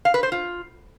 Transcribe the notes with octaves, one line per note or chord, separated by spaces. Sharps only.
F5
B4
C5
F4